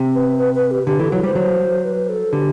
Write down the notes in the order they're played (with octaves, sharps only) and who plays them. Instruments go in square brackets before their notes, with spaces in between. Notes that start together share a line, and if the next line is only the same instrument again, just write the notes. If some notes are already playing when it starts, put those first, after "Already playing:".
Already playing: [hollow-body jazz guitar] C3
[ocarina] B4
B4
B4
G4
[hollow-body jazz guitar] D3 [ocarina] G4
[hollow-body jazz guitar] E3 [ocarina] A4
[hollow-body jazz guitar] F#3 [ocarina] B4
[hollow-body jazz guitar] G3 [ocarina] C5
[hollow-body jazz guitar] F#3
[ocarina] B4
A4
[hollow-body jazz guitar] D3 [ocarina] G4